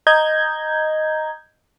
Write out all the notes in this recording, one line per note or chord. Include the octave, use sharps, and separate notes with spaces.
D#5 A#5 G6 G#6